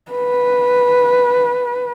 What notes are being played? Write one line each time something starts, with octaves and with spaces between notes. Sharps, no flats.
B4